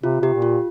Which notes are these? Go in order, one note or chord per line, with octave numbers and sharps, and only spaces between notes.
C3 F4
C3 G4
A#2
F4